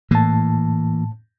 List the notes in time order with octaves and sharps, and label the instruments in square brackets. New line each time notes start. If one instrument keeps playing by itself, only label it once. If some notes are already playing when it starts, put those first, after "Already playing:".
[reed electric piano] A2 A5 [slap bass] E3 A#3